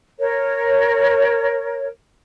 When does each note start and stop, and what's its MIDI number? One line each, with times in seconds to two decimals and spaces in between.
0.19 1.85 70
0.19 1.85 73